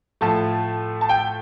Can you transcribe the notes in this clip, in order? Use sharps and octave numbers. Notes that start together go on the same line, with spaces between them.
A2 F3 A3 A5
A5
G5